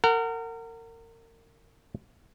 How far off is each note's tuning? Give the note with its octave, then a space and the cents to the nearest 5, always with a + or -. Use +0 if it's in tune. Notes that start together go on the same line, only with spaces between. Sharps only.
A#4 -30 F#5 +10